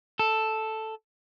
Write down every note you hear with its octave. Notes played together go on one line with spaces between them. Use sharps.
A4